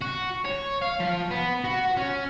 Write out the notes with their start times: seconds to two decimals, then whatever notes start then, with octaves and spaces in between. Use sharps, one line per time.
0.01 F#4
0.45 C#5
0.82 F5
1.00 F3
1.31 B3
1.64 F#4
1.97 C#4